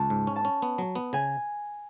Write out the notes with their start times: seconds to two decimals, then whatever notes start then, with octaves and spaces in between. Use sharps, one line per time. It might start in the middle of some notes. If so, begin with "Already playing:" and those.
Already playing: C#2 A5 B5
0.10 G#2
0.27 C#4
0.36 A5
0.45 C#4
0.62 B3
0.78 F#3
0.95 B3
1.13 C#3 G#5